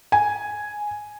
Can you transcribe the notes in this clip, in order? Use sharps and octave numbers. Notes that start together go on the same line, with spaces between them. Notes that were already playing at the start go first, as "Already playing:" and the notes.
G#5